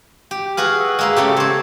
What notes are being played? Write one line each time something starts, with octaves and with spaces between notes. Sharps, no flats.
G4
F#4 G#4 B4 F5
E5
G#3 A#3 E5 C6
C#3 A3 G4
C4 C5 C#5